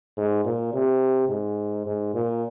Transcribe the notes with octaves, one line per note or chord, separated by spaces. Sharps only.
G#2
A#2
C3
G#2
G#2
A#2